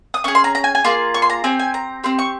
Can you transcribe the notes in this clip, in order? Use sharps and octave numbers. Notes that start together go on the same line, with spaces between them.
D#6
C#4 G#4 C#6
C6
A#5
A#5
G#5
G#5
A#3 F4 G#4 C6
C#6
C6
A#5
C4 G4 G#5
G#5
A#5
C4 G4 C6
C#6